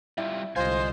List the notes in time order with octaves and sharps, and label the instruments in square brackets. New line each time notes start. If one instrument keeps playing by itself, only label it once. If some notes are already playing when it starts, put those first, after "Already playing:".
[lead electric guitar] G3 F4 [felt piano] E4
[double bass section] C2 D3 [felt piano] F4 [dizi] C5 [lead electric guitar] D#5 G#5